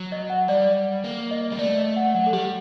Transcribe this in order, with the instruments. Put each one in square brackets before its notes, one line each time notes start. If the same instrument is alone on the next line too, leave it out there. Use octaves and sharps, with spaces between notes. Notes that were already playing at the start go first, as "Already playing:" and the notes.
Already playing: [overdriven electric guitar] F#3
[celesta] D#5
F#5
[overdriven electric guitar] G3 [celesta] D5
[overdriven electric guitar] A#3
[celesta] D#5
[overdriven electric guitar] G3
[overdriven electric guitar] A3 [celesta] D5
[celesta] D#5
F#5
[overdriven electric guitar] F#3 [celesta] F#5
[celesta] A4
[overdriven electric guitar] G3 [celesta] G4